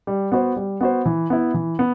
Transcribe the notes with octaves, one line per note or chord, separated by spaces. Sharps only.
G3
B3 F#4 C5
G3
B3 F#4 C5
E3
B3 E4
E3
B3